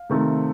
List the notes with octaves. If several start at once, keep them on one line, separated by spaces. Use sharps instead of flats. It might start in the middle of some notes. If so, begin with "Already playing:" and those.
Already playing: F5
C3 D#3 A3 C4